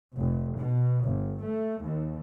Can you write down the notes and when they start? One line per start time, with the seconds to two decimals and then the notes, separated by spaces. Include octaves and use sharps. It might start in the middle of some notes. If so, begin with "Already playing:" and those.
0.16 F1
0.56 B2
1.03 G1
1.40 A3
1.80 D#2